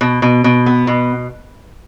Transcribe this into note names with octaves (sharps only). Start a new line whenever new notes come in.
B2
B2
B2
B3
B2